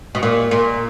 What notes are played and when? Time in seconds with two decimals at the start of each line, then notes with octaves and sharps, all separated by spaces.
0.15 B2
0.23 A#2
0.51 A#2